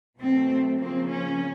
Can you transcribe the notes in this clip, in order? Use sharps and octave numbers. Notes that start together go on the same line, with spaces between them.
B2 F#3 A3 C4
C#3 F3 A#3 C4
C#4